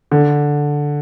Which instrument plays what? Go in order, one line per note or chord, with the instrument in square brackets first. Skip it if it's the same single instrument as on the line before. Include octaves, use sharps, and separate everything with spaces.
[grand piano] D3